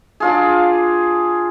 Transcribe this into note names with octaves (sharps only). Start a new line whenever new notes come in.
D4 F4 G#4